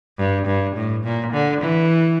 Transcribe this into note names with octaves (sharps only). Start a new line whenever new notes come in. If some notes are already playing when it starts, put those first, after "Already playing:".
G2
G2
A2
A#2
D3
E3